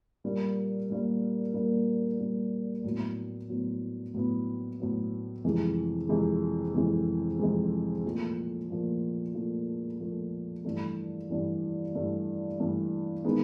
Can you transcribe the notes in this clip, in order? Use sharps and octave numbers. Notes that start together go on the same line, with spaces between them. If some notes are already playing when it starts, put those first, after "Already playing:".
A#2 G3 A#3
A#2 G3 A#3
A#2 G3 A#3
A#2 G3 A#3
A2 F#3 B3
A2 F#3 B3
A2 F#3 B3
A2 F#3 B3
F2 C3 E3 G#3
F2 C3 E3 G#3
F2 C3 E3 G#3
F2 C3 E3 G#3
A#2 F3 A3
A#2 F3 A3
A#2 F3 A3
A#2 F3 A3
G2 E3 A3
G2 E3 A3
G2 E3 A3
G2 E3 A3
D#3 G#3 B3 D#4